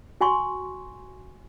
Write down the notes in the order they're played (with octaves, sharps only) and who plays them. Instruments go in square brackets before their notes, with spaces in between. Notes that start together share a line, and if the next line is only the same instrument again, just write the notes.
[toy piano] F#4 G#5 C6 C#6